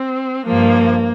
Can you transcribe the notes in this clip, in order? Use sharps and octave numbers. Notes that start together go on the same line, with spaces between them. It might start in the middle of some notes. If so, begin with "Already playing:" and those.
Already playing: C4
G2 F3 A#3